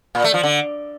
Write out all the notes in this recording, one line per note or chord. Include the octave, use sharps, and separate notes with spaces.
A#2
A3
F3
D3